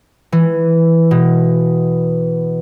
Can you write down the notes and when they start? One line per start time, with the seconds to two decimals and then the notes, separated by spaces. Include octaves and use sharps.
0.32 E3
1.11 B2